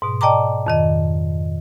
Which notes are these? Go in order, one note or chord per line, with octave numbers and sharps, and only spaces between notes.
G#2 B2
D5 D#5 G5 A5 A#5 D6
F2 D#3 D#5